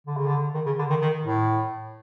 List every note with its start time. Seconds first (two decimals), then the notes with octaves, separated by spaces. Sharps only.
0.07 D3
0.17 C#3
0.26 D3
0.55 D#3
0.66 C#3
0.79 D3
0.90 D#3
1.02 D#3
1.25 A2